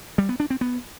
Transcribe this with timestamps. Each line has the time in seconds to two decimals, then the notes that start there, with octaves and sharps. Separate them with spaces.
0.18 G3
0.29 B3
0.40 D4
0.50 C4
0.61 B3